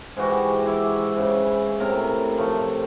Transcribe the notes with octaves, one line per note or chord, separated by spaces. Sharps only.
G#2 E3 F#4 G4
E4 E5 D6
G#2 C#3
A2 C3 A#4 A#5
F3 A3